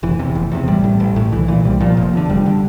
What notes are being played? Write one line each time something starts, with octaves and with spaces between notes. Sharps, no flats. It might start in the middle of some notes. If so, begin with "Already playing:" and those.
F1 E3
E2 C3
F1
E2 C3
A1 G3
A2
A1
A2
C2 E3
A#2 E3
C2 G3
A#2 F3
F1
E2 D3
F1 G3
D3